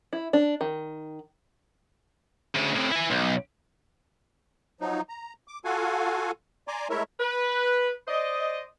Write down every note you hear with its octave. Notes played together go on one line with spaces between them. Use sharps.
E4
D4
D#3
D2 C#3
A2 C3
E4 G#5
B1
F3 F#3 D#4
A#5
D6
F4 F#4 A4 F5 F#5 G#5
D5 G#5 A#5 C6 D6
G#3 A3 E4 A#4 C#5 E5
B4
C5 D5 D#5